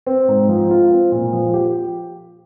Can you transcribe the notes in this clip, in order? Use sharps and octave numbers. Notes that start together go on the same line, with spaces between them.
C4
G#2
F3
F4
C4
A#2
F3
G4